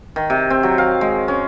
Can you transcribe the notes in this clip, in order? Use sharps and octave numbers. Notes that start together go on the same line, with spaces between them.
D#3
C3
C4
F#3
F5
G#3
C#4